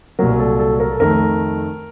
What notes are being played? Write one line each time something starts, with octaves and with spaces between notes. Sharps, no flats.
C2 A#2 F#3 A#4
A4
A4
A#4
A4
F2 D#3 A3 A#4